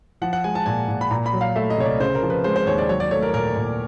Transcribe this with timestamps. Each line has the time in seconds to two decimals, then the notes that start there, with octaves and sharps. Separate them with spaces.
0.22 F3 F#5
0.33 F#5
0.44 G#3 G#5
0.55 A5
0.66 A#2 G#5
0.88 A#2
1.01 B5
1.11 A#2 A#5
1.26 B5
1.33 F#3
1.41 F5
1.56 A3 E5
1.70 D#5
1.78 C2 C#5
1.85 D5
2.00 C#3 C5
2.15 A#4
2.23 F3
2.30 B4
2.44 G#3 C5
2.56 C5
2.67 D#2 C#5
2.78 D5
2.89 F#3 C#5
3.00 D5
3.11 A3 C#5
3.22 A#4
3.34 A#2 A#4
3.56 A#2